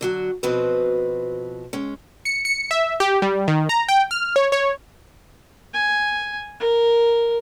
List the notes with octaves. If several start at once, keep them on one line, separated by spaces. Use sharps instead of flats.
D3 F#3 F#4
B2 F3 C4 F#4 B4
G#3 C#4
C#7
C#7
E5
G4
G3
D#3
A#5
G5
F6
C#5
C#5
G#5
A#4